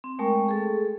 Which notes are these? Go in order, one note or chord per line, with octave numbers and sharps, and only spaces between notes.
C4
G#3 A3 A#4 G5 A5 C#6
G#4 A4